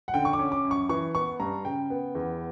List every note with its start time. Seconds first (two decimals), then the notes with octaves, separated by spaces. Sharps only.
0.08 F#5
0.14 D3 G5
0.25 C#6
0.33 D6
0.39 C#4
0.52 D6
0.64 F#2
0.71 C#6
0.89 E3 C#6
1.15 B3 C#6
1.40 G2 A#5
1.65 C#3 G5
1.90 B3
2.15 E2